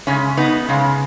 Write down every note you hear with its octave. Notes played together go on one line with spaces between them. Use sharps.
C#3 G#3 C#4
B3 D#4
C#3 G#3